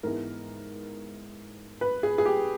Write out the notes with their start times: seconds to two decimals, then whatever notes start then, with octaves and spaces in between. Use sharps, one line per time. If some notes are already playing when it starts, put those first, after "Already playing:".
0.03 G#2 E3 G#3 B3 A#4
1.81 B4
2.03 G#4
2.18 G#4
2.25 G4